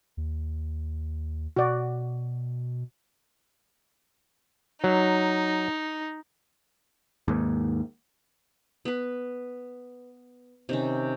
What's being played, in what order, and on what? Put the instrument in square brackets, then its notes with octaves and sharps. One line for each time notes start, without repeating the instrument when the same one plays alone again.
[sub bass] D#2
[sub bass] B2 [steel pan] F#4 D5
[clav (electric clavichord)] F#3 [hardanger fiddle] D#4
[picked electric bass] D#2 G#2
[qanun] B3 B4
C3 D#3 C#4